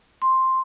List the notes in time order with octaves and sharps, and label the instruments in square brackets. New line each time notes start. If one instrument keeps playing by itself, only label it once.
[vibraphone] C6